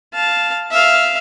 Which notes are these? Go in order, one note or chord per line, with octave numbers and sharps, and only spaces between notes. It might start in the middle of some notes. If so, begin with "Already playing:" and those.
F5 A5
E5 F5